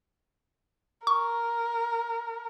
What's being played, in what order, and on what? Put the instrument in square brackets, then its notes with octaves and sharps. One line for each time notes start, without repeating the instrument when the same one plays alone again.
[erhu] A#4 [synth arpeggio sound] C#6